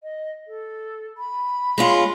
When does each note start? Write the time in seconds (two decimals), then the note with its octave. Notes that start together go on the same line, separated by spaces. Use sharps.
0.03 D#5
0.47 A4
1.17 B5
1.78 G#3 C#4 F4